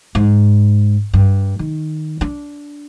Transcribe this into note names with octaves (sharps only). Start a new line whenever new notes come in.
G#2
G2
D#3
D4